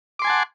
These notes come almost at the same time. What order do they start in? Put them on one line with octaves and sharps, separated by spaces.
D6 C6 G#5 A5 F#5